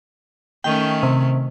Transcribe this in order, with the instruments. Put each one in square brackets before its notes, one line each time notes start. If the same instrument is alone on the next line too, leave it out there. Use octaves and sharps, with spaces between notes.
[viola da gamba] D#3 A3 C#4 [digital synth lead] G5
[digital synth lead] C3